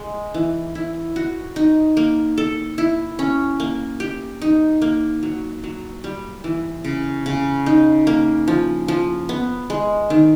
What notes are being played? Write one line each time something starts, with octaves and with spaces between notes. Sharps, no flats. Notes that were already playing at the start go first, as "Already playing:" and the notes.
Already playing: G#3
E3
E4
F#4
D#4
A#3
A4
E4
C#4
A#3
G4
D#4
A#3
F#3
F#3
G3
E3
C#3
C#3
D#4
A#3
F3
F3
B3
G#3
D#3